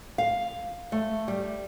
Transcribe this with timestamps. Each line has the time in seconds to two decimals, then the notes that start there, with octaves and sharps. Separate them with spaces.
0.18 F5
0.92 A3
1.28 G3